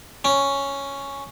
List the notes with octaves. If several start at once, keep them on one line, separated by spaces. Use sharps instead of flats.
C#4